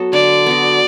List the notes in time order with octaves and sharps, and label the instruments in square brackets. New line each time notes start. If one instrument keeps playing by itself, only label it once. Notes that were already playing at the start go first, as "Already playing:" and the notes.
Already playing: [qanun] F#3 B3 F#4 A4
[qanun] D3 [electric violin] D5
[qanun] B3 F#4